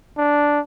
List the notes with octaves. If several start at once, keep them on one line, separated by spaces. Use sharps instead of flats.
D4